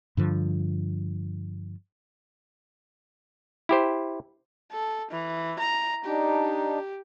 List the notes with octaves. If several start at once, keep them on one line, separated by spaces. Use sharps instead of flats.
G2 D3 F3
E4 G4 C5
A4
E3
A#5
D4 D#4 G4